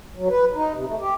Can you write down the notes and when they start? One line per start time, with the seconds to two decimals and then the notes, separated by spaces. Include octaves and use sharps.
0.17 F#3
0.29 B4
0.55 D#4
0.74 C3
0.87 A3
1.00 G4